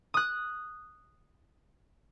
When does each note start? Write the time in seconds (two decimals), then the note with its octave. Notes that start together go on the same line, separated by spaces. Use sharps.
0.14 D#6 F#6